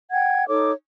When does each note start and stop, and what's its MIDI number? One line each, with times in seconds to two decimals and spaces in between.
0.11 0.45 78
0.11 0.45 79
0.11 0.45 92
0.47 0.72 63
0.47 0.72 69
0.47 0.72 73
0.47 0.72 86